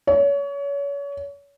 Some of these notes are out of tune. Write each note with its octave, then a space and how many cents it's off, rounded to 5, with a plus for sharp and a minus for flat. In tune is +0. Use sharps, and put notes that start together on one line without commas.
C#5 +30